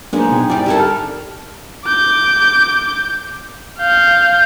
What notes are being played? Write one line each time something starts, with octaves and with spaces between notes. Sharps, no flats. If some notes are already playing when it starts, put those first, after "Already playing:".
F#3 G#3 A#3 B3 D4 D#4 G#4
B2 G5
G3 C4 E4 D5 G5
D3 E4 G4 A4 A#4
F6
D6 G6
F5 G6